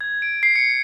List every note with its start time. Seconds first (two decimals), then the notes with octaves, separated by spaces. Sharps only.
0.01 G#6
0.22 D7
0.43 C7
0.56 C#7